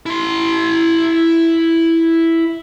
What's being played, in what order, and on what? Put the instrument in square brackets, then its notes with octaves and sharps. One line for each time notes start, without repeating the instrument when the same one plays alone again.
[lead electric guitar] E4 C6